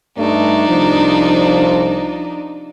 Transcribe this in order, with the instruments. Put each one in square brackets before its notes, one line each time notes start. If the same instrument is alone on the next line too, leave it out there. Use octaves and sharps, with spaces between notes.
[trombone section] G2 G3 A3 [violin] D4 D#4
[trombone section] C2 F3